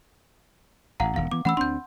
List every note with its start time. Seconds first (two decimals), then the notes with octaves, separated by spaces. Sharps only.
1.00 A1 F5 F#5 A#5
1.16 E1 E2 D#3 F5
1.32 E3 B3 D6
1.45 E3 A3 C#4 F#5 B5 E6
1.57 D2 C4 D4 C6 G6